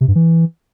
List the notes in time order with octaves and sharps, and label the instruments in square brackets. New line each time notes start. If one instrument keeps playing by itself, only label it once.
[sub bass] C3
G2
E3